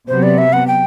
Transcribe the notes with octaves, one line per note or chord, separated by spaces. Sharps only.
C3 F#3 B3 C5
D5
E5
F#5
G5